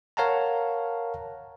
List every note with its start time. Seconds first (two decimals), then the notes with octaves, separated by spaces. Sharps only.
0.17 A#4 C#5 F5 F#5 A5 A#5